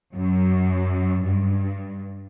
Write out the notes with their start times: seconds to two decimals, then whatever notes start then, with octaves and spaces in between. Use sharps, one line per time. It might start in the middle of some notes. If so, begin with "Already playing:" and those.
0.14 F#2
1.24 G2